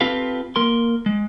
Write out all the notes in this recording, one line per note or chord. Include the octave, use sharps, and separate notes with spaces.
C4 F4 G4 A4 B4 F5
A#3 A#4 C6
G#3